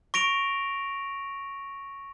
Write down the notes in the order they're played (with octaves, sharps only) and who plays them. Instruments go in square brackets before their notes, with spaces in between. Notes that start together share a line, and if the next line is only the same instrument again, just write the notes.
[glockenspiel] C#6 A#6 D7 F7